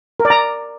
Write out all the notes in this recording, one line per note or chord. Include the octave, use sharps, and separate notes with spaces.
A#4
D5
A#5